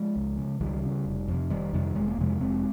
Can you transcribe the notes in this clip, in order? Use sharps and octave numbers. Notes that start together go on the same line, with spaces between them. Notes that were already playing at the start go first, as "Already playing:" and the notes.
Already playing: F3 G#3
C#2
C#3
C#2 D#3 G3
C#3
F1
F2 C3
F1 D#3 G3
F2 C3 D#3 G3
F1 G#3
A#3
F2 C3 F3 G#3
F1 G#3 C4